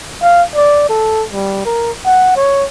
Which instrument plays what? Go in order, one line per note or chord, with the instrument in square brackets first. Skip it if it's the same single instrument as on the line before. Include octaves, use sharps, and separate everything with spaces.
[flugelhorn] F5
D5
A4
G3
A#4
F#5
C#5